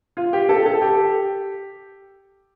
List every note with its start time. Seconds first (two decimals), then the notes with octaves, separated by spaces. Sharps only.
0.17 F4
0.33 G4
0.49 A4
0.66 A4
0.82 G4